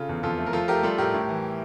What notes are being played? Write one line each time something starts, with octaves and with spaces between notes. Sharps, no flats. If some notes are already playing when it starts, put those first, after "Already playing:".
Already playing: C#3 F4 A4
E2
F2 F4 A4
A3
A#4
F3 F4 A4
A3 G4 A#4
G3 F4 A4
A2 G4 A#4
A2
E3